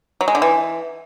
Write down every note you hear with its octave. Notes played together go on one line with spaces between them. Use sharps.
F#3
G#3
D3
E3